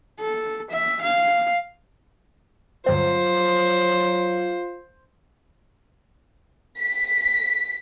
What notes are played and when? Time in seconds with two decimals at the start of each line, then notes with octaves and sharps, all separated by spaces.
0.20 A4
0.71 E5
1.02 F5
2.86 D2 G2 F#3 C4 F4 C5
6.80 B6